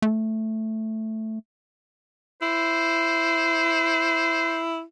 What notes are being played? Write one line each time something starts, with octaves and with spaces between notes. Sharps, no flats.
A3
E4 C5